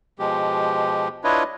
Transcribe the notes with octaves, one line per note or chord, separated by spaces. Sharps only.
B2 F3 G#3 G4
D4 E4 F4 B4 C#5 D#5